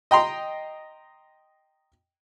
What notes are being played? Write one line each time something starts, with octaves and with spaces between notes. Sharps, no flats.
D#5 G5 A#5 C6